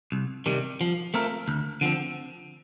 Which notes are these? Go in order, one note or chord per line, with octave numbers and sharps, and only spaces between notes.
C2
C3 D#3 G3
F3
A3 C4 F4 A#4
D2
D3 F3 C4